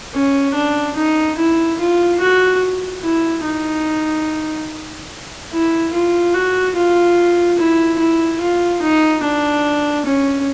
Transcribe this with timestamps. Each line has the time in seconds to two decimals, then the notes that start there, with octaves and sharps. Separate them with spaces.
0.14 C#4
0.55 D4
0.97 D#4
1.38 E4
1.80 F4
2.20 F#4
3.03 E4
3.44 D#4
5.52 E4
5.93 F4
6.34 F#4
6.76 F4
7.59 E4
7.99 E4
8.41 F4
8.82 D#4
9.24 D4
10.06 C#4